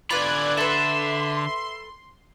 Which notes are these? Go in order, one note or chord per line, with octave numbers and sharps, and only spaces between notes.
D3 F4 B4 D5 B5 F#6 G#6
A4 B4 E5 C6